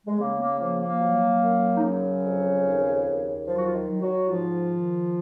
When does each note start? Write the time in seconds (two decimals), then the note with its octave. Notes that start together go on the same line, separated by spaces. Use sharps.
0.07 G#3
0.19 C#3 A#3
0.40 A#3
0.60 F3 A#3
0.80 A#3
1.01 F#3
1.42 F#2
1.77 D#4
1.83 C#3 F#3 C#4
2.24 F2
2.65 D#2
3.05 D#2
3.47 F3 F#3 F4
3.57 F#4
3.66 F4
3.74 D#3 D#4
3.88 F#3
4.02 F#3 F#4
4.29 G#2 F3 F4
4.70 D#3